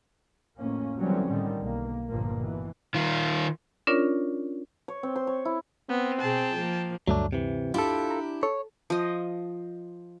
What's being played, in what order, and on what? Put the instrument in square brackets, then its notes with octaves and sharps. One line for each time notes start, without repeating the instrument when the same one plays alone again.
[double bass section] F2 A2 A#3 C#4
D3 E3 F#3 G3 C4 C#4
A2 D3 D#3 G3
B1 A#3
G1 G2 A#2 F3 A#3
B2 E3
[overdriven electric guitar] D#3 F4
[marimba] C#4 D4 F4 A#4 C#5 D5
[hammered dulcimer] C#5
C4
C5
C#5
E4
[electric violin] B3 [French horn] C4
[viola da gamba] B2 G#4 [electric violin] G5 A5
[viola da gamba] F3 A#3
[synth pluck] D2 G2 [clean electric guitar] F#3 A3 D4
[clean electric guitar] C3 E3
[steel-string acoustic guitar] D4 E4 G4 [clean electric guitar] F4 A4
[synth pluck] A#5
[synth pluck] A4 [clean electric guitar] C#5
[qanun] F3 D#5